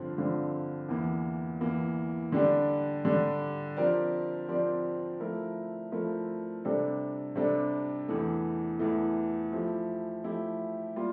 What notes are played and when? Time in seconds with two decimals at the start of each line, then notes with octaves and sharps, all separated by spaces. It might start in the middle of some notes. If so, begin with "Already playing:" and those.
Already playing: G2 D3 F3 C4
0.18 G2 D3 F3 C4
0.89 E2 E3 A#3
1.61 E2 E3 A#3
2.32 D3 G3 D4 G4
3.05 D3 G3 D4 G4
3.77 F3 C4 G4 A#4 D5
4.49 F3 C4 G4 A#4 D5
5.20 F3 A3 E4 A#4
5.92 F3 A3 E4 A#4
6.65 C3 G3 D4 A4
7.35 C3 G3 D4 A4
8.08 E2 E3 A3
8.79 E2 E3 A3
9.52 F3 A3 E4 G4
10.24 F3 A3 E4 G4
10.96 G3 A#3 F4